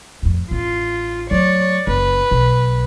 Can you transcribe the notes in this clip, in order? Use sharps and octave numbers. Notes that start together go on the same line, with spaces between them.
F2 A2
A1 F4
F#3 A3 C#5 D5
F#1 B4
B1 F#3